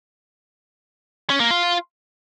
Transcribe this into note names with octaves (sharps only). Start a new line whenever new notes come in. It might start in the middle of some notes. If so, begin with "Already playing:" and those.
C#4
A#3
F4